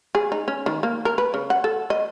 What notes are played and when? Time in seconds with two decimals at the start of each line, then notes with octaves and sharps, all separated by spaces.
0.15 G#4
0.32 D#4
0.48 C#4
0.66 D#3
0.83 A#3
1.05 A#4
1.18 B4
1.34 C#3
1.50 F#5
1.64 A4
1.90 D#5